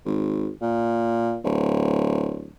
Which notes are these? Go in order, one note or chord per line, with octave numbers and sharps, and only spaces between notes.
G#1
A#2
D1